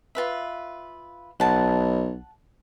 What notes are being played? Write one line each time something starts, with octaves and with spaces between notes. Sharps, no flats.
F4 B4 E5
B1 F#5 A5